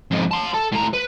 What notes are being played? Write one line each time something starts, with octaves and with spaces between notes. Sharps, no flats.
F2 G#2
A5 C6
A4 A5
A2 A#5
B4